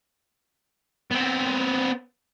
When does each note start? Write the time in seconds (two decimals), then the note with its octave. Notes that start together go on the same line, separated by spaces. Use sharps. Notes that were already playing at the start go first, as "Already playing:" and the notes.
1.11 B3 C4